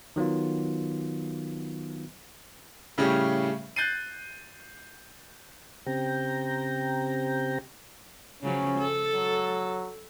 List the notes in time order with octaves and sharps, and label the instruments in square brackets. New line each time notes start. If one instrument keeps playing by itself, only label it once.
[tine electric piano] D#3 F#3 B3 F4
[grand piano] A2 C#3 G3 C#4 G4
F#6 G6 A6 C7 D#7
[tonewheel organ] C#3 C4 G4 G5 A#5
[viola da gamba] C#3 F3 F#3 [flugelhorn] C#4
[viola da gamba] A4
[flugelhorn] F#3